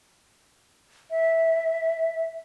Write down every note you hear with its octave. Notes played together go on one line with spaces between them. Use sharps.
E5